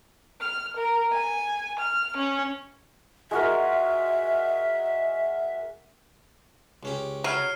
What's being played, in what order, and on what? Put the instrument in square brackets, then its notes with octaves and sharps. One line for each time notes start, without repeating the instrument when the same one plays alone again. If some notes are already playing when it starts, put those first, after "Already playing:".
[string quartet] F6
A#4
G#5
F6
C#4
[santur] G#3 F#4 A#4 [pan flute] E5
[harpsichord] C#2 C#4 G4
[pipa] F#3 [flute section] C#5 [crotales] F6 C7 D#7